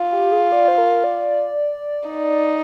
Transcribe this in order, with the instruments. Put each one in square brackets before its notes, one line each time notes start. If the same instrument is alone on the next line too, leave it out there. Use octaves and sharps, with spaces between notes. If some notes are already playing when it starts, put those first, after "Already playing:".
Already playing: [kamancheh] F4
[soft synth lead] G4
G#4
D5
C5
A#4
D5
[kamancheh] D#4